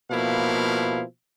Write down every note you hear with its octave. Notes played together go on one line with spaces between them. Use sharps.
B2 F3 A#3 E4 F5